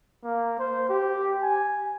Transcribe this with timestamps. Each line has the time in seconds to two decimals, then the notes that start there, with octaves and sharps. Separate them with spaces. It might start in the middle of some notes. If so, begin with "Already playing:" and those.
0.23 A#3
0.59 C5
0.89 G4
1.43 G#5